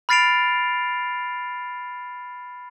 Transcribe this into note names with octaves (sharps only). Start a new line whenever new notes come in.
B5 F6 A6 C7 D7 F7